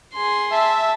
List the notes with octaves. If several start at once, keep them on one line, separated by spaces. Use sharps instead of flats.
G#4 C6
E5 A5